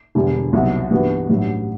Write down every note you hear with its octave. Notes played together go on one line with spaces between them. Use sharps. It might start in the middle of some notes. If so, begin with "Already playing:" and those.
E1 E2 D3 G3
C2 B2 F#3
G2 E3 B3 F#4
A1 G2 F#3